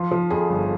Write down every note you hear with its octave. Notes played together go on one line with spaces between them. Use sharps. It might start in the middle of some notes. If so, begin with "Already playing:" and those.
Already playing: F3 F4
F3
F2 G#4
G1